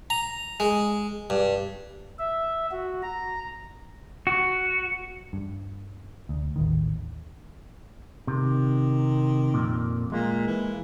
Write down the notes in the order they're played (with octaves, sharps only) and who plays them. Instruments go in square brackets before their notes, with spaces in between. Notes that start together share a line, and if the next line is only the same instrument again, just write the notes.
[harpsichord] A#5
G#3
G2
[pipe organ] E5
F#4
A#5
[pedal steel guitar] F#4
[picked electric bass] G2
D2
A1 D#2 D#3
[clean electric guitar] C3 [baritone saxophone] D#3
[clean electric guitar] F2 A#2
[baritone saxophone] A#2 [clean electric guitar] G#3 A#3
[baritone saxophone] E3